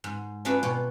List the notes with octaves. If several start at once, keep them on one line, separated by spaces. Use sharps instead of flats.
G#2
C#4 D4 F4 G#4 B4
B2 F4 C#5 G5